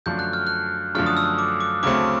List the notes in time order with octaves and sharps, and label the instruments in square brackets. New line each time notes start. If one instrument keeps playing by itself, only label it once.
[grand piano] F#2 D3 F3 A3 D4 [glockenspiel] G6
[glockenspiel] F#6
F6
F#6
[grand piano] F#2 D3 F3 A3 D4 [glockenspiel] F6
[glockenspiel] D#6
E6
D6
D6
[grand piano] D2 C#3 F#3 A3 C4 [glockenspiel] D6